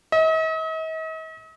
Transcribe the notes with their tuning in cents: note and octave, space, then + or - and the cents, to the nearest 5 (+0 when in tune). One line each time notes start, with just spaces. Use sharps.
D#5 +45